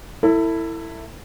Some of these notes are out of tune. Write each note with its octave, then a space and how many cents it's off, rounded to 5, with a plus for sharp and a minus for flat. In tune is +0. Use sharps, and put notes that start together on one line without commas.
E4 +0 A4 +35